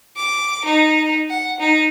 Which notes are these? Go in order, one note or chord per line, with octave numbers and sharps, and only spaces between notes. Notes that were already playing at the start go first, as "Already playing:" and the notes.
D6
D#4
F#5
D#4